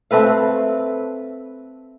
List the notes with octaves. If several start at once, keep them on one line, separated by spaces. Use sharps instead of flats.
A3 C4 B4 F5